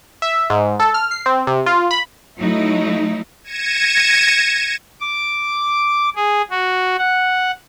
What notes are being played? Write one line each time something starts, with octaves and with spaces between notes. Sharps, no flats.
E5
G#2
A4
F6
C7
C4
C3
F4
B5
F#3 A3 D#4 E4
G#6 A#6 C#7 D#7 E7
D6
G#4
F#4
F#5